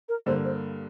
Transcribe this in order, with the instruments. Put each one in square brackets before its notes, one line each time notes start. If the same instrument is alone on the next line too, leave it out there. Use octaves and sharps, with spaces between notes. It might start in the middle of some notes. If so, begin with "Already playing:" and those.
[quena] A#4
[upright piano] G2 D3 A#3 [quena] C5
[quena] C5